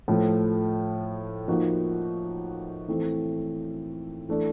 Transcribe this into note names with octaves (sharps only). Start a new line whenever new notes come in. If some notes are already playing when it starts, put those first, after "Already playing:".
A2 F3 A3
F3 A#3 D#4 F#4
E3 A3 C4 E4
E3 A3 D4